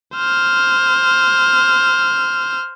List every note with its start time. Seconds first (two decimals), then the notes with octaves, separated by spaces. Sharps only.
0.15 C5 F6